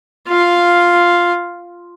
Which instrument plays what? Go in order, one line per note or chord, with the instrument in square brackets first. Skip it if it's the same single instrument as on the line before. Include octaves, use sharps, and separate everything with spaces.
[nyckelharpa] F4 F5